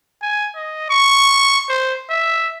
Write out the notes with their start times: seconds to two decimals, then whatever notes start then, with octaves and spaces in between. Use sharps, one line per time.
0.22 G#5
0.55 D#5
0.90 C#6
1.69 C5
2.10 E5